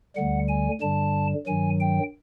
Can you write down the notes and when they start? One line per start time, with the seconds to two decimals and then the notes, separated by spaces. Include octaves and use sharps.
0.16 D2 D3 G3 F#5
0.48 G#5
0.81 G2 D3 G3 A5
1.47 G2 D#3 F#3 G#5
1.80 G5